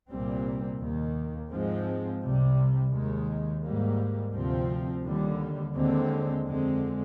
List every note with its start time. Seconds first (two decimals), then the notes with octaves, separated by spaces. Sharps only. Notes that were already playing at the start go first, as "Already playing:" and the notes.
0.09 C2 A#2 G3 C4
0.80 D#2 D#3 A#3
1.50 G#2 F3 G#3 C4
2.21 C2 C3 G3 C4
2.92 D#2 D#3 G#3
3.62 G#2 G3 A#3
4.33 D2 C3 F3 C4
5.03 D#2 D3 G3
5.74 D#2 D3 G#3 C4
6.45 F2 D3 G#3 C4